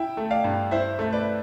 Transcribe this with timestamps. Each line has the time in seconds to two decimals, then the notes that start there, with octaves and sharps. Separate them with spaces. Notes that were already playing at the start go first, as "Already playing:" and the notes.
Already playing: E4 E5 G5
0.17 A3
0.31 D5 F5
0.44 G2
0.71 E4 C5 E5
0.99 A3 E5
1.13 B4 D5